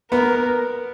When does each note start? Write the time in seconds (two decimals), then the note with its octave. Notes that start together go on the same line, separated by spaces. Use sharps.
0.11 B3 A#4